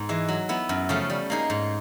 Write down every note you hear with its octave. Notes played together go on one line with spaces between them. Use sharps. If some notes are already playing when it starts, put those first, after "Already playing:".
Already playing: G#2 B3
E3 G#3
F#3
B3 E4
F#2
C#3 F3 A3 C#4
G3
A#3 D#4 G#4
G#2